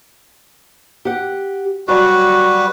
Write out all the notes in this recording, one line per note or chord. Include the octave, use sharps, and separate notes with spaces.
G4 F#5
F#3 G3 F#4 B4 D5 G#5